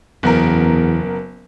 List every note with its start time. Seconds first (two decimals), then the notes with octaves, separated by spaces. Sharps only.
0.23 F#1 E2 B3 A#4